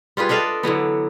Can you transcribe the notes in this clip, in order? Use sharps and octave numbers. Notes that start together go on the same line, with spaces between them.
G3 F4 G#4 B4
D4 A4 D#5 F5
D3 E3 F#3 B3